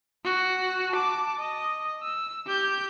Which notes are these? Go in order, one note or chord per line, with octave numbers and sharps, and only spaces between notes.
F#4 F#5
A5 D6
D#5
E6
G4 G6